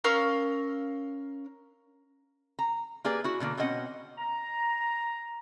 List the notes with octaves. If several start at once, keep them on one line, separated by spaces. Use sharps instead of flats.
C#4 A#4 F5 E6
A#5
A#3 G4 G#4 B4 D5
E4 F#4
B2 D3 G#3 A#3
B2 C4 C#4 D#5 F#5
A#5